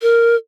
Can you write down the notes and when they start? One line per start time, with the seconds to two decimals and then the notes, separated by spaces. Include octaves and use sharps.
0.02 A#4